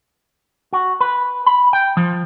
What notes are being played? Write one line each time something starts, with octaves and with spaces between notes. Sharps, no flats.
F#4
B4
B5
G5
F3